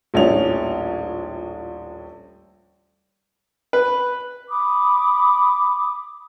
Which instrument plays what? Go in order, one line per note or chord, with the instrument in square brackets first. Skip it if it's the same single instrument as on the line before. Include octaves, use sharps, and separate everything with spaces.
[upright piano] D#1 A#1 A2 C#4 F7
[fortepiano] B4
[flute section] B5 D6 D#6